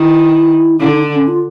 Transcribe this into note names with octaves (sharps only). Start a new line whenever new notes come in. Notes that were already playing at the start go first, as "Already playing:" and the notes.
Already playing: D#3 E4
D3 E4
D#4
D4
C#4
F4